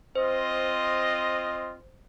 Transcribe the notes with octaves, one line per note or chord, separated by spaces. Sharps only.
C4 F4 C5 D#5